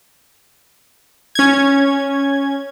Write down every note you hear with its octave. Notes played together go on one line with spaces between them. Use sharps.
C#4 G#6